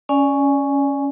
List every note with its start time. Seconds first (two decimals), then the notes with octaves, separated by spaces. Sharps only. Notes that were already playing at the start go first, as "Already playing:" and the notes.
0.09 C#4 D5 G#5